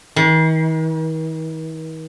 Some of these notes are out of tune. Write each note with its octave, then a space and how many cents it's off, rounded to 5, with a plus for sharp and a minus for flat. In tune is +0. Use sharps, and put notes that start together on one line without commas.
D#3 +45